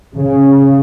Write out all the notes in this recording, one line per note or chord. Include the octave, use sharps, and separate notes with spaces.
C#3